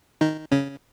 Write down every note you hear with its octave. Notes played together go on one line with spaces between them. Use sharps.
D#3 D#4
C#3 C#4